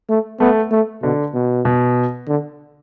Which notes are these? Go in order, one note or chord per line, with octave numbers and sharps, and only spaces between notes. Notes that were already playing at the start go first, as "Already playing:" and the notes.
A3
A3 B3
A3
B2 D3
B2
B2
D3